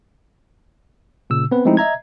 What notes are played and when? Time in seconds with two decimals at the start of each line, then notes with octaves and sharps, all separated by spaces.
1.30 A#2 C#3 E6
1.51 B3 C4 B4
1.65 F3 G#3 A3 C4 D#4 E4
1.77 D#5 E5 A#5 G#6